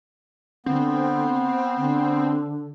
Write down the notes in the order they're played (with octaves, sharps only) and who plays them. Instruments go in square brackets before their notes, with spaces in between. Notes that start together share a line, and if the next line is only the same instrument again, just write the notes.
[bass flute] D3 [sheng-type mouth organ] B3 [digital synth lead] C4
[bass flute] D3